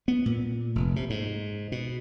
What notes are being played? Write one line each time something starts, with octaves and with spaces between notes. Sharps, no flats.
B3
A#2
F1
C3
G#2
B2